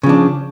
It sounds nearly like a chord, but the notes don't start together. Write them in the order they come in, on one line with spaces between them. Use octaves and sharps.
C#3 F3 D4